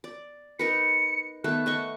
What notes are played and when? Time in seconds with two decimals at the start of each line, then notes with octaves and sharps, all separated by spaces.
0.04 D5
0.59 D#4 A#4 B4 C#7
1.44 D#3 A3 B3 F#6
1.66 A3 D#5 C#6